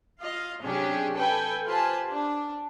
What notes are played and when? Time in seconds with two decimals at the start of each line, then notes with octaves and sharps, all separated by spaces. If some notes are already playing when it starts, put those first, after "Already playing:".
0.21 F4 D#5 F5
0.62 C3 F#3 C#4 D4 G4 G#4
1.14 A4 B4 G5 G#5
1.66 F4 G4 B4 C5 G#5 A5
2.10 D4